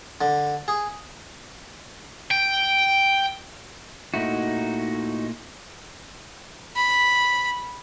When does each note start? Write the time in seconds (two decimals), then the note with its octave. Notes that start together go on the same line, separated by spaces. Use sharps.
0.21 D3
0.68 G#4
2.31 G5
4.14 A#2 A3 D#4 E4 F#4
6.76 B5